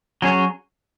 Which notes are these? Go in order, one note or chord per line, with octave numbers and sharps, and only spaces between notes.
F#3 C#4 G#4 C#5